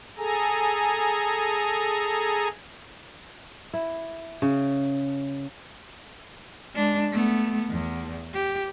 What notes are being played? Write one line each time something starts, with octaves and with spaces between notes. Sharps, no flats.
G#4 A4 G#5 A#5
E4
C#3
G#3 D4
A3 B3
E2
G4